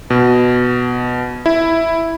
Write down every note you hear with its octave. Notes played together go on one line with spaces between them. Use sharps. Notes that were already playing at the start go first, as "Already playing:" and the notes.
B2
E4